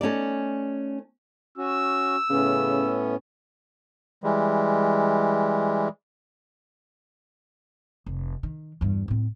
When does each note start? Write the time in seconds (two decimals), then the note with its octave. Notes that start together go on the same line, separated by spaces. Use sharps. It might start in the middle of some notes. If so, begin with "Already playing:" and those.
0.01 A3 C#4 D#4 D5
1.58 C#4 F#4 E6
2.30 A2 C#3 B3 C#4
4.24 E3 G3 G#3
8.06 F1
8.43 D#3
8.81 E2 G2
9.08 A2 C4